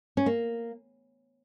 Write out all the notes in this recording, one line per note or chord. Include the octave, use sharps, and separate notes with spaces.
C#4
A#3